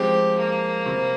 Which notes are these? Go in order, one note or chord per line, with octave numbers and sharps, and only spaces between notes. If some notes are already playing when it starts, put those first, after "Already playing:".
Already playing: F3 G#3 C4 G4
A#3
C3 G3 C4